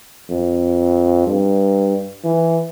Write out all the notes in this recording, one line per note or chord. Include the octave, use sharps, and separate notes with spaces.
F2
G2
E3